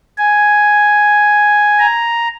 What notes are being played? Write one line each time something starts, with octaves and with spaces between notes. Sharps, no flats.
G#5
A#5